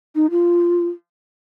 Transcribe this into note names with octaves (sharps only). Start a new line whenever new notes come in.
D#4
F4